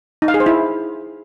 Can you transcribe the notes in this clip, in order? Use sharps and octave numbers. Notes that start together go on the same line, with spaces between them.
D#4
F5
G#4
C5
E4